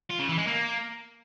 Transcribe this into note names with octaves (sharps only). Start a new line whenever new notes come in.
F4
C#3
E3
G#3
A#3